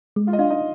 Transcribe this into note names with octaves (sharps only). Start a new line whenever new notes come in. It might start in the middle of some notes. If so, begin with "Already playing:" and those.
G#3
F4 F5
D#5
D4 F4 F5
D#4 D#5